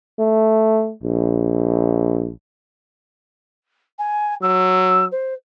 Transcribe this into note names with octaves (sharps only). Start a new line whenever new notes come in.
A3
A#1
G#5
F#3 E6
C5